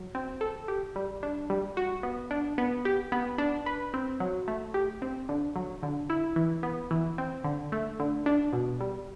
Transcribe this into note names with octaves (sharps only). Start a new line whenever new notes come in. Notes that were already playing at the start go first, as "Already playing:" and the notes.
Already playing: F#3
C4
A4
G4
G3
D4
G3
F#4
B3
D4
B3
G4
B3
D4
B4
C4
F#3
A3
G4
C4
D3
F#3
D3
E4
E3
B3
E3
C4
D3
A3
D3
D4
B2
G3